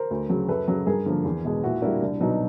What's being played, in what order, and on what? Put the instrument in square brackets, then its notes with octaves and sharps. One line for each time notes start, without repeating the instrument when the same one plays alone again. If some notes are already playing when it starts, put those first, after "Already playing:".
Already playing: [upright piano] A#4 C5
D2
C#3 F#3
F#2 A4 B4
C#3 F#3
G2 G#4 A#4
D3 F3 A#3
E2
B2 G#3
A#2 E4 F#4
G3 A#3 D4 E4
C2 D4
B2 F#3 D#4